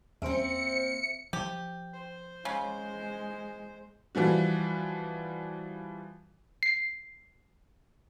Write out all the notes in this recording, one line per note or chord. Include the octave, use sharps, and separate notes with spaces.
E2 A#3 C4 C#4 C5 E5 C#7 D7
F3 G4
C5
C#3 G#3
E3 F3 G3 F#4
C7